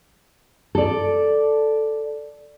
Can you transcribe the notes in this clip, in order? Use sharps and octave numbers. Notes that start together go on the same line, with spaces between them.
A4 D5